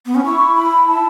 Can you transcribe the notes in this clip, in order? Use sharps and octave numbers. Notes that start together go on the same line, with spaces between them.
B3
C#4
E4 C#6
B5
A5